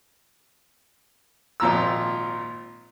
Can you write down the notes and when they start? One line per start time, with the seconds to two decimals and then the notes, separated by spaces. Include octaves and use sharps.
1.60 G#1 A#2 F3 A#5 E6